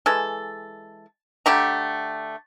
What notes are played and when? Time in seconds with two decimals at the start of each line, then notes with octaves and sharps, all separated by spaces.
0.06 E3 G#3 A4
1.46 D3 A3 G4 A#5